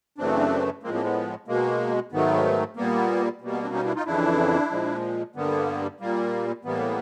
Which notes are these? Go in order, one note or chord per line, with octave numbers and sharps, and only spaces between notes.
F#2 C#3 E3 A3 C4 D4
A2 F3 G#3 A#3 C4
A#3 C4
B3
B2 G#3 A#3
G#2 D#3 F#3 A3 B3
A#2 G3 A#3 B3
B2 G3 A#3
B3
C4 D4
C#4 D#4
D4 E4
D#4 F4
F2 C#3 E3 D4 E4
A#2 F3 G#3
G2 D3 G3 A#3 B3
A#2 G3 A#3
A2 E3 G3 A#3 B3